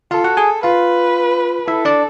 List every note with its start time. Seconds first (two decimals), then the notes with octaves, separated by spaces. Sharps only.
0.11 F4 A4 F5
0.24 F#4 F#5
0.37 G#4 G#5
0.63 F4 B4 F5
1.68 E4 A4 E5
1.85 D4 D5